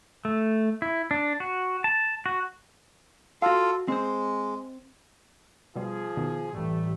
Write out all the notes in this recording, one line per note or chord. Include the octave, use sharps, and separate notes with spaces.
A3
E4
D4
F#4
A5
F#4
F4 F#4 A4 F5
G#3 C4 C5
B2 F3 G3 F4 G#4
B2 D#3
A1 G3 A3